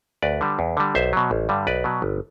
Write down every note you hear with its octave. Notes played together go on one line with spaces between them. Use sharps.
D2 B4 D5
D3 G3
E2
D3 G3
B1 C5 E5
B2 F#3
A1
G2 D3 G3
B1 B4 D5
B2 F#3
G1